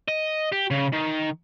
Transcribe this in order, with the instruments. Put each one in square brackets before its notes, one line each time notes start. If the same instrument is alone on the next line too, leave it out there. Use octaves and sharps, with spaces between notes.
[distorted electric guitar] D#5
G4
C#3
D#3